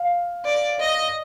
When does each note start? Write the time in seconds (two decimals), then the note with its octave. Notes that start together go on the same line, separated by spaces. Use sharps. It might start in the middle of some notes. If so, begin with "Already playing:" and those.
Already playing: F5
0.45 D5
0.80 D#5